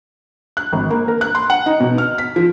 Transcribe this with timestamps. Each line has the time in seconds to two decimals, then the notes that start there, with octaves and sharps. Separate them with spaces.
0.57 F#6
0.73 G#1
0.90 A#3
1.08 A#4
1.21 F#6
1.35 C6
1.50 F#5
1.66 D#4
1.80 B2
1.98 F6
2.18 B6
2.36 F3